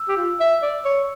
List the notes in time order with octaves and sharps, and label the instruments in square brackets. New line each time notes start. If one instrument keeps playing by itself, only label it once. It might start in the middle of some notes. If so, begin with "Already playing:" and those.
Already playing: [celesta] E6
[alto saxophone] G4
F4
E5
D5
C#5